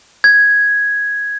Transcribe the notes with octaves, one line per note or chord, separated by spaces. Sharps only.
G#6